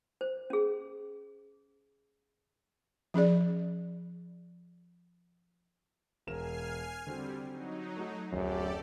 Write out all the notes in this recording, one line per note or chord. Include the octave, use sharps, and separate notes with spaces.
C5
C#4 G#4
F3 C#4 G#4 D5
E1 A#4 G#5 F6 C7 E7
D3 G3 C4 F#4
F#3 D#4
A3 F#4
D1 F#2 G4 A4 D5 C7